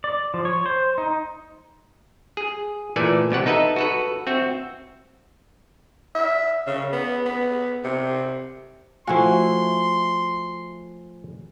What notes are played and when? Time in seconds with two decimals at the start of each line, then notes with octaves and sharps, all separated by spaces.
0.04 D5
0.34 F3
0.45 C#5
0.66 C5
0.98 D#4
2.37 G#4
2.96 A#2 E3 A3 A4 D5 G#5
3.31 C2 B2 G4 F#5
3.46 D#4 A4 B4 D#5 E5
3.76 F#4 A4 B4
4.27 C4 F#4 E5
6.15 E5
6.67 C#3
6.92 B3
7.26 B3
7.84 C3
9.07 F3 A3 E4 F#4 F5 G#5 C6